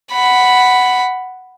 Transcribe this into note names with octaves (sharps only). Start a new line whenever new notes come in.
F#5 B5